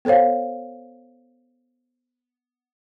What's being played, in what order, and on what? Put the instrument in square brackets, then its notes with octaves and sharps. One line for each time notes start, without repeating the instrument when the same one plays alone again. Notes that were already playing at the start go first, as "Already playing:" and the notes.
[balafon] B3 A4 C5 C#5 F5